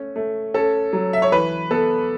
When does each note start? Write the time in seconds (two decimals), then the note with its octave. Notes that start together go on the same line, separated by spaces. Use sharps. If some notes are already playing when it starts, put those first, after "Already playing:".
Already playing: A3 C#4
0.16 A3
0.54 C#4 A4
0.93 F#3
1.13 E5
1.22 C#5
1.32 E3 B4
1.71 B3 A4